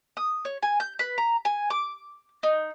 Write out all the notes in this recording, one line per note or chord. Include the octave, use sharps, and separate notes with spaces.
D#6
C#5
G#5
G6
B4
A#5
G#5
D6
D#4